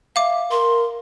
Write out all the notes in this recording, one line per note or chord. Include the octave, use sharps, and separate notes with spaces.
E5 F5 D6
A#4 C6